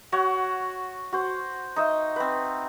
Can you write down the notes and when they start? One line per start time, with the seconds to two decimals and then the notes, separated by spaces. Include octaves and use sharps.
0.12 F#4 C#5 F#5
1.13 F#4 C5
1.76 D#4 D#5 E5
2.16 C4 B4